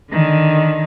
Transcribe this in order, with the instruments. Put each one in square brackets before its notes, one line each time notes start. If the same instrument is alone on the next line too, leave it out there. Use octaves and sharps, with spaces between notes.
[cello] D3 D#3